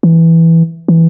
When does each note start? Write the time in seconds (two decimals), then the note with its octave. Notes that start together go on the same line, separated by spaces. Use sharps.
0.03 E3
0.88 E3